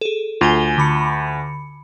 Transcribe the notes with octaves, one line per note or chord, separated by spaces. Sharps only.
G#4 A4
D2 F4 G#5 G7
D3 B5 C#7